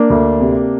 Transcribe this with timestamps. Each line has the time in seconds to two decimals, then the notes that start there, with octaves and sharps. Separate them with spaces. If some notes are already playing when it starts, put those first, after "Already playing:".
Already playing: A#3 D4
0.10 D2
0.41 C3